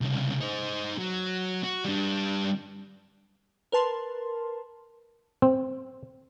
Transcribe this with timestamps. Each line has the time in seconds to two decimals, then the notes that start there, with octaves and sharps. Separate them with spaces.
0.01 C2 C#3
0.41 D#4 C5
0.98 F#3
1.64 F#4
1.85 G3 D4
3.72 A#4 B4 A5 C6
5.42 C4